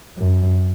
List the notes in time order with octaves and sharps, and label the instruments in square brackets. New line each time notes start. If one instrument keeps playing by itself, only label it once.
[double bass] F#2